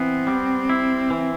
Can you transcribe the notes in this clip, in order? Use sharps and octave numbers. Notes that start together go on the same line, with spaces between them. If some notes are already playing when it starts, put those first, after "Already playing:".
Already playing: E3 B3 C4
G3
E4
E3